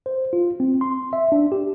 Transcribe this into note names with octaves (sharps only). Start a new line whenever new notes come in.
C5
F4
C4
C6
E5
D4
G4